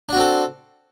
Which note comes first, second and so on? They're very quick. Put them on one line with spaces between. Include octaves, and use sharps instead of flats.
D4 F#4 C4 A4